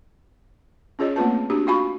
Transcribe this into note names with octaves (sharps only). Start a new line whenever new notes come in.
C#4 F4 G#4 C#5 D#5
A3 A#3 C4 F4 B4 A5
D4 F#4 G4
F4 F#4 F5 G#5 B5 C#6